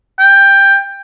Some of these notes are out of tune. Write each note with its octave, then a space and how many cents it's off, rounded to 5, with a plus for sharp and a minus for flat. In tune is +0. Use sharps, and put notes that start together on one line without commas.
G5 +10